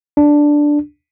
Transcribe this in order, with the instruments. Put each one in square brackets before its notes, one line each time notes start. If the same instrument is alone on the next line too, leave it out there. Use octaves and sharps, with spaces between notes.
[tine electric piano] D4